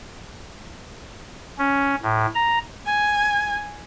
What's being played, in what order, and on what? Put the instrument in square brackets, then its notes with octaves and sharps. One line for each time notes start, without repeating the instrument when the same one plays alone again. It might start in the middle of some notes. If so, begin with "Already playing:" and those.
[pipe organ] C#4
A2
A#5
[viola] G#5